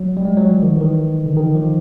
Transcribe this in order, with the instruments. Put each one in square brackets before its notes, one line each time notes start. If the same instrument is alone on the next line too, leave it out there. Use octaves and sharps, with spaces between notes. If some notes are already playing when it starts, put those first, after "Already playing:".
Already playing: [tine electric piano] F#3
G3
G#3
F#3
F3
D#3
E3
D#3
D3
D#3
F3